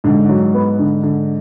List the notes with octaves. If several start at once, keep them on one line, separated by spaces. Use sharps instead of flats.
G#2 D3
F#3
B3
D3
D3